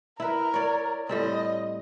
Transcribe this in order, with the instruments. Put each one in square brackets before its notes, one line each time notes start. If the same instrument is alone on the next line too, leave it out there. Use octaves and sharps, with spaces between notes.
[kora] E4 B4 [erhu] A#4
[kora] C#5 D5
[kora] A2 G3 C4 [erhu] D#5